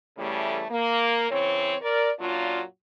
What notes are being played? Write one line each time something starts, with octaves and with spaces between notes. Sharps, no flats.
C#3 E3 G3 A3
A#3
C#3 E3 C4 C#5
A#4 D5
F#2 A#2 F#3 D4 F4